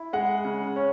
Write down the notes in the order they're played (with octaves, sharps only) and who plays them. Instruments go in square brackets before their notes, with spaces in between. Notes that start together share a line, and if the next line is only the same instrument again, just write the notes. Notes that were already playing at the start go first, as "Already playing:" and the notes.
Already playing: [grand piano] E4
G#3 F#5
C#3
C#4